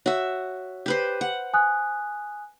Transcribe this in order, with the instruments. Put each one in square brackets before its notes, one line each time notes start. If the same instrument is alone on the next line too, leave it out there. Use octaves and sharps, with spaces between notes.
[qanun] F#4 E5 [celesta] C#5
[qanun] G4 B4 C5
F#5
[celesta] G#5 D#6 F#6